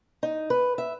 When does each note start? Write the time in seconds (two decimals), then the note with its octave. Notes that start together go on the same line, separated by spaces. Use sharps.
0.23 D#4
0.50 B4
0.78 E5